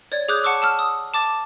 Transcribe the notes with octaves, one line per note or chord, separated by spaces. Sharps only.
C#5 D5 G#6
G#4 C#5 D6 D#6 F#6 G6
F#5 A5 C#6 D6 E6 F#6
A5 E6 F6
D#6
A5 D6 A6